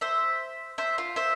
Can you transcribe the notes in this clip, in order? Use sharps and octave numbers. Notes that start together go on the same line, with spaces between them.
C5 E5
C5 E5
F4
C5 E5